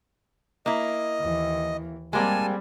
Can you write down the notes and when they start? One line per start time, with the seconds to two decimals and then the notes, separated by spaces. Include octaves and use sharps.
0.66 A#3 E4 D#5
1.20 D#2 E3
2.13 G3 G#3 A#3 C4 G#5 A5